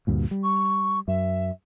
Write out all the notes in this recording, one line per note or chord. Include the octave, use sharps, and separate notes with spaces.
D2 G2 A#2
G3
C#6
F#2 E5